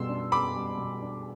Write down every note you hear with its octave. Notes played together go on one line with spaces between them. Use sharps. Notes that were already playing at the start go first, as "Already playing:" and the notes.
Already playing: B2 G3 B3 C6 E6
D4
B3 B5 D6
G3
B2
D4